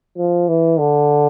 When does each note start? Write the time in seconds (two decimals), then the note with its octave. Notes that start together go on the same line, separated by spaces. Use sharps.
0.18 F3
0.48 E3
0.79 D3